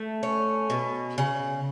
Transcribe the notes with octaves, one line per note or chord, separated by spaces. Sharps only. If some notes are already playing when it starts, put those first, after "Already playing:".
Already playing: A3
C#4
B2
C#3